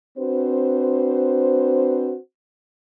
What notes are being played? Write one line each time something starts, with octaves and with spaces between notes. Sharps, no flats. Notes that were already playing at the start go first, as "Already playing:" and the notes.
C4 D4 F#4 B4 C5